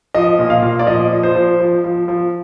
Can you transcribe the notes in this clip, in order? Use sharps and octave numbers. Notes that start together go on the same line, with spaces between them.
F3 D#5
A#2
F5
A#2
D5
F3 D#5
F3
C5
F3
F3
F3
F3